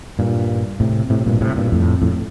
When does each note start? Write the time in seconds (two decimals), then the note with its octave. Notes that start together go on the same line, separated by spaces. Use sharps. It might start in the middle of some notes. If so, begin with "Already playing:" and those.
0.19 G2 A#2
0.80 A2 C3
1.10 A2 C3
1.26 G2 A#2
1.41 A2 C3
1.56 G2 A#2
1.72 F2 A2
2.02 F2 A2